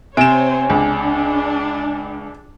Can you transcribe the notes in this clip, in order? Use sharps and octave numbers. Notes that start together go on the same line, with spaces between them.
C3 C4 C5 C#5 G#5 D7 E7
C#2 D4